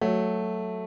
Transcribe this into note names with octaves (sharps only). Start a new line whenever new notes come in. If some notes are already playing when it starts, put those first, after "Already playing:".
F#3 A3